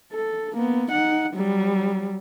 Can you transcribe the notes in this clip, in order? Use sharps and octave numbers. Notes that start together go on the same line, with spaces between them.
A4
A#3 B3
D#4 F#5
F#3 G3